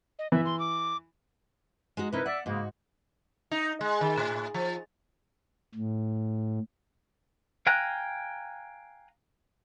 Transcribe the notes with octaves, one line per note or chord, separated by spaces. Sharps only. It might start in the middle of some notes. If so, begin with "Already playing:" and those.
D#5
E3 E5
C6
D6
G#3 D#4 F#4
C3 D#4 E4 A#4 B4
D5 E5 F#5
G#2 C#3 G#3 A#3 F#4
D#4
G#3
D#3
A2
F3
A2
F5 G5 G#5 A#5 F#6